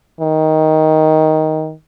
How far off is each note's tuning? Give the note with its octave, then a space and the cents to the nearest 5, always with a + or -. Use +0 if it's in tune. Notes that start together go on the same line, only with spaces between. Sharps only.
D#3 +10